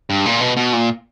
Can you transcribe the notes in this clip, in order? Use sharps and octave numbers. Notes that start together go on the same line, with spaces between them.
G2
A#2
B2
B2
A#2